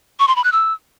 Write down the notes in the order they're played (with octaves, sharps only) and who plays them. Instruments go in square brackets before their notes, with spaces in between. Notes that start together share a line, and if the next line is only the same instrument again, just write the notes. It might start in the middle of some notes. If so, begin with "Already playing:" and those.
[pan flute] C#6
C6
B5
F#6
E6